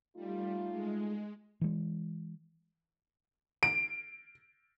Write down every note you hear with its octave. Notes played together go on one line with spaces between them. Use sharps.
G3 A3 D#4 F4
G#3
E3 G#3
D7